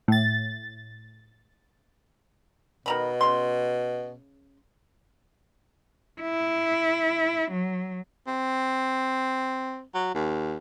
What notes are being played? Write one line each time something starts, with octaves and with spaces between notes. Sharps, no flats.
A2 A6
B2 D#3 A#5 B5
C#3 C6
E4
F#3
C4
F#3
D#2